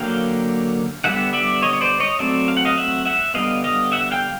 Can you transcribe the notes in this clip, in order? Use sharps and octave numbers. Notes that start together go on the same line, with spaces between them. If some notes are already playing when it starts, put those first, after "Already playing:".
Already playing: D3 F#3 A#3 F5 G5
D3 G3 B3 E5 F#5
D5 E5
C#5 D#5
C#5
C5 D5
C#5 D#5
F#3 A3 C4 D5 E5
F5
F#5
D#5 F5
E5 F#5
E5 F#5
D3 G3 B3 D#5 F5
D#5 F5
E5 F#5
F5 G5